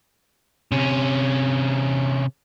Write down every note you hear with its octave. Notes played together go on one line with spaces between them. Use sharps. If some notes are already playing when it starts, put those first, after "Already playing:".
C3 C#4